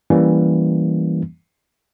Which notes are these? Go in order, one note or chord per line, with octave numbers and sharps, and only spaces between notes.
E3 G3 A#3 C#4